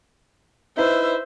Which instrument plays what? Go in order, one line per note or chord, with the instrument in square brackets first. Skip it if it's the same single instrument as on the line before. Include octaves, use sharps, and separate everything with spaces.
[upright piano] D#4 E4 B4 [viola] C5 E5